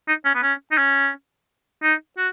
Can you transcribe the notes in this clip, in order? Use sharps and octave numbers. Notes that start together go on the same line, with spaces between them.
D#4
C#4
B3
C#4
D#4
C#4
D#4
F#4